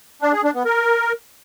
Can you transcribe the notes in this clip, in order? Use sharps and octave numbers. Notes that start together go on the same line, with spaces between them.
D4
G#4
D4
B3
A#4